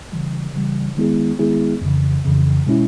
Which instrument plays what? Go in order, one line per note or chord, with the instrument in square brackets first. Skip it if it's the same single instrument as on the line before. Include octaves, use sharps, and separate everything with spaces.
[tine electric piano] C#3 E3 G3
C#3 E3 G3
D#3 G#3 B3 E4 G#4
D#3 G#3 B3 E4 G#4
F2 C#3 E3
F2 C#3 E3
B2 G#3 C#4 E4